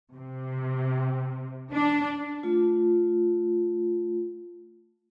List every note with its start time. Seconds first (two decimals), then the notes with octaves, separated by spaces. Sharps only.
0.15 C3
1.73 D4
2.43 A3 F4